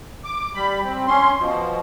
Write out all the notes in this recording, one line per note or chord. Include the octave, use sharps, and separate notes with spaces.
D6
G3 B5
C4
C#4 C6
B2 F3